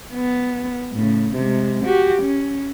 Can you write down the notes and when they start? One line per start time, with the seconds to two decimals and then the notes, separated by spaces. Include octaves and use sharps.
0.14 B3
0.93 A2 C#3
1.35 C3 G#3
1.84 F#4 G4
2.22 C#4